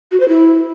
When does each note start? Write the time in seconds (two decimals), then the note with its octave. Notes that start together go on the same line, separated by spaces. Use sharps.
0.12 F#4
0.20 C5
0.29 E4